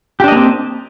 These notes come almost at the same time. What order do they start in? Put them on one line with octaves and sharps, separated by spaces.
G4 D4 D#5 A#3 C4